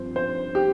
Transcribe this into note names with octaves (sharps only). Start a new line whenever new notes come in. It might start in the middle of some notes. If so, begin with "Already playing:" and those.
Already playing: G2 F3 C4 C5
C5
G4